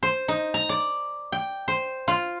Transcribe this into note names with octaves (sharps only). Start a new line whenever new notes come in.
C5
D#4
A#5
D5
G5
C5
F4